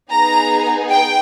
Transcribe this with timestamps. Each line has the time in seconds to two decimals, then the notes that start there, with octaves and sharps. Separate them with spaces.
0.11 B3 D#4 G#4 A#5
0.91 G5